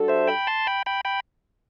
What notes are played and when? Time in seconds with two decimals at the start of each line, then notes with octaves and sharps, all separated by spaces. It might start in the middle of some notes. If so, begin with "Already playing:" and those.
Already playing: G3 D4 F#4 A4
0.08 C5 E5
0.28 G5 B5
0.47 A5 C6
0.67 G5 B5
0.86 G5 B5
1.05 G5 B5